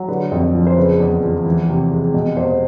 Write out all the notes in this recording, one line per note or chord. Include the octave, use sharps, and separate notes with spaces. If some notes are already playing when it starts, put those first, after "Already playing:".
Already playing: F#3
D3 B4
F2
F3
C5
C#3 B4
E2
F3
E3
C3
G#3
B2
E2 C5